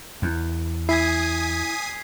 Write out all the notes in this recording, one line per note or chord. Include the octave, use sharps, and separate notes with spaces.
E2
E4 G#5 D#6 G#6 B6 C7